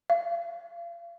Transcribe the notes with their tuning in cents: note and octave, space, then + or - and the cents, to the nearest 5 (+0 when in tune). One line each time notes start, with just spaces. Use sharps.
F5 -35